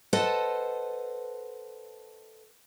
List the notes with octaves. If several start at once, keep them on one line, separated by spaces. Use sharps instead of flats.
A4 B4 C5 D#5 F#5 A5